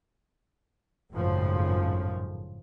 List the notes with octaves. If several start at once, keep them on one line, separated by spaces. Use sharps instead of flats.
G#1 F#2 A2 C#3 F3